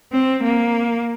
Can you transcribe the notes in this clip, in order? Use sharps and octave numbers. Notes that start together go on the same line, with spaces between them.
C4
A#3